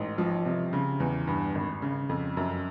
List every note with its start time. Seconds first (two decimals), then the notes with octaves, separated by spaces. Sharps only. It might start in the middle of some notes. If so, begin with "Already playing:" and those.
Already playing: A1 G#2
0.18 F3
0.46 C3
0.73 C#3
1.00 E2
1.27 G2
1.55 G#1
1.82 C#3
2.09 F2
2.37 F#2